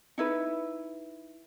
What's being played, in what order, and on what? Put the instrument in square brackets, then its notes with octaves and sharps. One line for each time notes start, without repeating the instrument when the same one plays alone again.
[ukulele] D#4 E4 B4